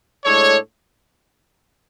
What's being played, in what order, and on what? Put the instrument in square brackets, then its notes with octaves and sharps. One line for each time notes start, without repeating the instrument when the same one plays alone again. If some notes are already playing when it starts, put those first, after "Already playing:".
[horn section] A2 G#3 D4 A4 C#5